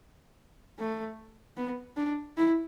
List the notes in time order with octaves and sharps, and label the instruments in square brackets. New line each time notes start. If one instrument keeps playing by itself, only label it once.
[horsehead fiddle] A3
B3
D4
E4